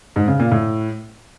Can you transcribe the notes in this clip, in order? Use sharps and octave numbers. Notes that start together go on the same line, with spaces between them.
G#2
C#3
A#2
A2